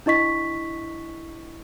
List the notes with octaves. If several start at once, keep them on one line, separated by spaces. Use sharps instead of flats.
D4 E4 D#5 C#6 B6